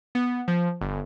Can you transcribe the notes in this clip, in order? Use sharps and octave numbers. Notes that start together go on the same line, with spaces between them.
B3
F3
G1